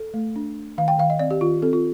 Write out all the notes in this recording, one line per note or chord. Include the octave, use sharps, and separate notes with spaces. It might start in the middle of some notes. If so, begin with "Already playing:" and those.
Already playing: A4
A3
D4
D4
D#3 F5
G5
D#3 F5
D#5
C4 D5
G4
D#3 F4
C4 A4
F4